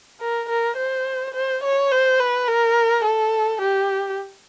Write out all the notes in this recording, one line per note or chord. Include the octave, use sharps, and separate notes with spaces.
A#4
A#4
C5
C5
C#5
C5
B4
A#4
A4
G4